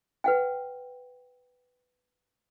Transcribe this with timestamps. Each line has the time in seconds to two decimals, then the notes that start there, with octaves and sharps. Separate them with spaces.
0.24 B4 F#5 G5